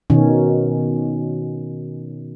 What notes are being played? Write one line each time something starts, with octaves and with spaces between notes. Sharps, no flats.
B2 D#3 C#4